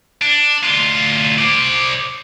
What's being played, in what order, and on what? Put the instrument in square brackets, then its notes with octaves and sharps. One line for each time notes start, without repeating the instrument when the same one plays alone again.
[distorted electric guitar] D4
D2 F4
C5 D5